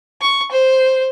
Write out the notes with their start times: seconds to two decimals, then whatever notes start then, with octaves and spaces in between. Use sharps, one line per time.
0.21 C#6
0.52 C5